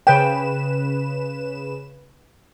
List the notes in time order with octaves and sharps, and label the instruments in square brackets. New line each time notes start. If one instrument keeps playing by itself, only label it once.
[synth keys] C#3 B4 E7 [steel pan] G5